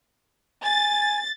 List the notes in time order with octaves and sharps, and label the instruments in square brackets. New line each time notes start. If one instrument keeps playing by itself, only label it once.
[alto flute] G#5 [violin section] A6